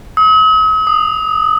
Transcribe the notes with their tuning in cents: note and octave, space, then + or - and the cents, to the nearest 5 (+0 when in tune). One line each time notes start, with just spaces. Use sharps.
D#6 +45
D#6 -15